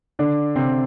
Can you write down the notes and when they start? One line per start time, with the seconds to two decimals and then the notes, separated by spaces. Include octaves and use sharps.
0.19 D3 D4
0.55 C3 C4